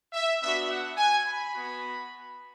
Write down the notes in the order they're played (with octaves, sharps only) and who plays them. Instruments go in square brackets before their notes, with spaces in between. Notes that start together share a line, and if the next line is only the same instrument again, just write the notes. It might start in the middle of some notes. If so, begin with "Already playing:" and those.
[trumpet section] E5
B3 D4 F#4 E5
F#5
G#5
B5
B3 F#4